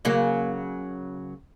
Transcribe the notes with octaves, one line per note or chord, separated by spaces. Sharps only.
C#3 F#3 A#3